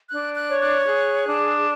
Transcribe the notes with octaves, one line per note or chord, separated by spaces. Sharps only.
D4 F#6
F#6
C#5
F#6
G#4 F#6
D4